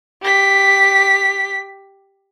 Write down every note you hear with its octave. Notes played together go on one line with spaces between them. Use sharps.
G4 B6